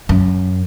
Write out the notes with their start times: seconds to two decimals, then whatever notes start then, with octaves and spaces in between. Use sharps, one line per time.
0.09 F#2